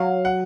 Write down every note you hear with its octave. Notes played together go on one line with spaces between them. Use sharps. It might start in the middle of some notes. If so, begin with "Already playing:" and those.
Already playing: F#3 F5
F#5